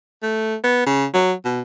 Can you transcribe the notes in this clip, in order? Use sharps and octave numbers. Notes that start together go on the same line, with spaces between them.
A3
B3
C#3
F#3
B2